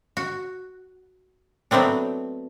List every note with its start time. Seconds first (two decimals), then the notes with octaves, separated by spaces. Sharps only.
0.17 F#4
1.71 F#3 A3 B3 C4 D4